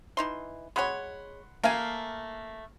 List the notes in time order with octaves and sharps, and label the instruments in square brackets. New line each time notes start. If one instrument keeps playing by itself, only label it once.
[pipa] E3 D#4 C6
[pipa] G#3 C#5 [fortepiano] F#5 B5 C6
[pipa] A3 G#5 [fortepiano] A#3 F5